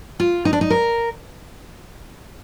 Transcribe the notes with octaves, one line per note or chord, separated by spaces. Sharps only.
F4
D#4
D4
D#4
A#4